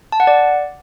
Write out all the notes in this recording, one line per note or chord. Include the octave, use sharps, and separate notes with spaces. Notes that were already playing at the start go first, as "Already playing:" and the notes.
A5
F#5
D5